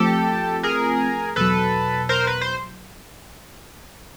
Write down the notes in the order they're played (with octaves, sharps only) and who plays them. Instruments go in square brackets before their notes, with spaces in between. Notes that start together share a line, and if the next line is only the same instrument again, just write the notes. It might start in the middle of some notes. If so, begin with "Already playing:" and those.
Already playing: [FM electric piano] F3 A3 C4 F4 [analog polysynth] G4 A4
[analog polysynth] G#4 A#4
[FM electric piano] E2 B2 F#3 [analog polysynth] A4 B4
[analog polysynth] A#4 C5
B4
C5